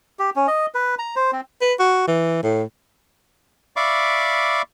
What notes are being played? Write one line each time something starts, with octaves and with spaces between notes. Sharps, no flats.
G4
C#4
D#5
B4
A#5
C5
C4
B4
F#4
E3
A2
D5 E5 F5 B5 C#6 D6